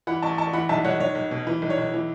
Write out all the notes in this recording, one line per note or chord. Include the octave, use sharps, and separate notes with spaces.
E3 F#5 B5
A1 A5 C#6
A1 A5 C#6
E3 F#5 B5
B1 E5 A5
B1 C#5 F#5
B1 C#5
B1
B2
E3 B4
B1
C#5
B1
E3